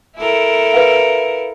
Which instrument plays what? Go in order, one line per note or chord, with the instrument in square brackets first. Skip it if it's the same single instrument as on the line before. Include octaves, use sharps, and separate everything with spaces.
[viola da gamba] E4 A4 A#4
[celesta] B4 F5